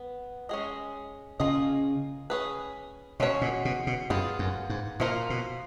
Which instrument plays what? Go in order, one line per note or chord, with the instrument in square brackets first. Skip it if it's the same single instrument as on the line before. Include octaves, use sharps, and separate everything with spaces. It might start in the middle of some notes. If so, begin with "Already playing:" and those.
Already playing: [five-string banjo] B3
G#3 C#4 G#4 D#5
[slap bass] C#3 [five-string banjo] A#3 F4 G#4 D#5
[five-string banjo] C#4 G#4 B4
[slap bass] B2 [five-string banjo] G#3 C#4 F#4 C#5
[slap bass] A#2
B2
B2
[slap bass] F#2 [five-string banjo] B3 F4 G#4
[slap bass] F#2
G#2
[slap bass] A#2 [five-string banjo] F3 A#3 F4 A#4
[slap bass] B2